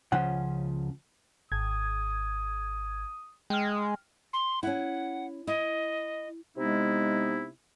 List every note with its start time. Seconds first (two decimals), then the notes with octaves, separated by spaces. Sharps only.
0.12 C#2 C#3 F3 C#4 F#5
1.52 G#1 D#6 G#6
3.50 G#3 G5 F6
4.33 C6
4.63 C#4 E4 F#5
5.47 E4 D#5
6.57 C3 G#3 B3 D#4 E4